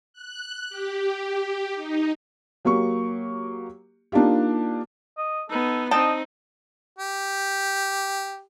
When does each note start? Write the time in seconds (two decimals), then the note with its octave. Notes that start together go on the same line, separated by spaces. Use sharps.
0.13 F#6
0.69 G4
1.75 D#4
2.65 F#3 A#3 G4 C#6
4.12 A#3 D4 D#4 F4 G4
5.18 D#5
5.50 B3 D#4 A4
5.91 C4 D4 D#4 D#5 G5 A5
6.97 G4